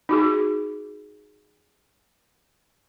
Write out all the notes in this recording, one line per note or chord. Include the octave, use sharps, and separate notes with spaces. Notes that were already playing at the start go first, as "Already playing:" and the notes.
D#4 F#4 G#4